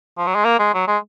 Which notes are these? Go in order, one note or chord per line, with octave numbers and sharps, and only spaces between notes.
F3
F#3
G#3
A#3
G#3
F#3
G#3